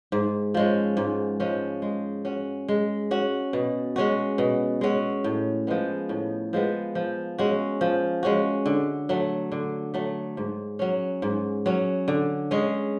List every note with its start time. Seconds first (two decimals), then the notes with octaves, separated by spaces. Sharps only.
0.12 G#2
0.54 F3 G#3 C#4
0.97 G#2
1.40 F3 G#3 C#4
1.82 G#3
2.25 C#4 F#4
2.69 G#3
3.11 C#4 F#4
3.53 B2
3.96 G#3 C#4 F#4
4.38 B2
4.81 G#3 C#4 F#4
5.24 A2
5.67 F3 G#3 B3
6.09 A2
6.53 F3 G#3 B3
6.95 F3
7.38 G#3 C#4 F#4
7.81 F3
8.23 G#3 C#4 F#4
8.66 D3
9.09 F#3 A3
9.52 D3
9.94 F#3 A3
10.37 G#2
10.79 F#3 C#4
11.22 G#2
11.66 F#3 C#4
12.08 D3
12.51 G#3 C#4 G#4